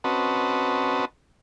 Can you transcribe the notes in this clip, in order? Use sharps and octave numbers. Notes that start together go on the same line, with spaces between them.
C4 C#4 F#4 B4 D#5 A5